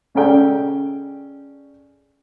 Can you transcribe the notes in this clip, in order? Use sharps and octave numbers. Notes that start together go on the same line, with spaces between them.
C#3 G#3 C#4 A4 D5 G5